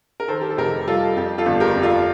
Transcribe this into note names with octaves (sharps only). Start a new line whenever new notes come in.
A#4
D#3 A4 C5
G4
A4
F1 G4 A#4
G3 F4 A4
F2 G4
F4 A4
G1
G4 A#4
F2
F4 A4